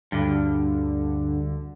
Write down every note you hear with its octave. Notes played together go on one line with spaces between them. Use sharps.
D2 G2 D3